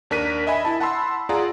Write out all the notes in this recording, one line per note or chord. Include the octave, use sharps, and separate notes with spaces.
D#2 D4 A#4 B6 D#7
D#5 E5 G#5 B5
E4 A5
F#5 A5 B5 C6 E6
F4 G#4 D5 F#5 A#5